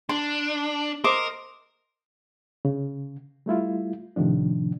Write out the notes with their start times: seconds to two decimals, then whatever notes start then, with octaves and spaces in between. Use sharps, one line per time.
0.09 D4 C6
1.04 A#4 C5 D#5 D6
2.65 C#3
3.46 G3 A3 E4 F4
4.16 A2 C3 D#3 F3 D4